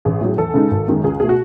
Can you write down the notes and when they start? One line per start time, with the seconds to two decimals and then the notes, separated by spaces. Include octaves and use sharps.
0.05 A1 G#4
0.21 A2 F#3
0.37 E2 A4
0.54 C#3 G#3 D#4
0.71 G#1
0.88 F#2 D#3 G#3
1.03 C#2 G#4
1.20 B2 A3 G#4
1.29 F#4